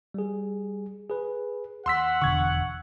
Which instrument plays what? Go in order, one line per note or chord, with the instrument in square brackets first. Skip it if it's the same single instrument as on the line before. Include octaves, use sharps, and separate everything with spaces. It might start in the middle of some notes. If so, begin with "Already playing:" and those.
[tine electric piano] G3 G#4
G#4 B4
[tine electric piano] D#2 [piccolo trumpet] F#5 [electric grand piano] C6 E6 B6
[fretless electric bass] E1 D3 [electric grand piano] C#6 G#6